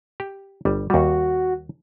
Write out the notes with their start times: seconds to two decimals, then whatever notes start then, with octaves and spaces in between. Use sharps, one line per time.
0.20 G4
0.65 G1 G3
0.90 D#2 G3 F#4